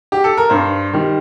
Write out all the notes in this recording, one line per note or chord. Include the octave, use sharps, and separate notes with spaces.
G4
A4
A#4
G2 C5
D#3 G3